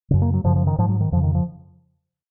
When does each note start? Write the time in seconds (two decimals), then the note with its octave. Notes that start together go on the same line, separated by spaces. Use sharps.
0.11 F#2 C#3
0.22 A#3
0.34 F#3
0.44 F#2 C#3 F3
0.56 F3
0.67 D#3
0.78 G#2 F3
0.89 F#3
1.00 D#3
1.12 F2 F3
1.16 C#3
1.23 D#3
1.35 F3